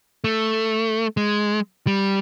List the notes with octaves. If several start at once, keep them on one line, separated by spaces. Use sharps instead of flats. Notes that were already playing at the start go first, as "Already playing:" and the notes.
A3
G#3
G3